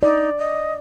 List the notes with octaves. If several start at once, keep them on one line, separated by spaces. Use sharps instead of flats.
D#4 D5
D#5